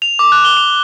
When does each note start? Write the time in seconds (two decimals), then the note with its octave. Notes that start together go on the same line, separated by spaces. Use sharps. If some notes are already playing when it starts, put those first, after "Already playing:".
0.02 F7
0.19 D6
0.32 F#6
0.45 G7
0.57 F7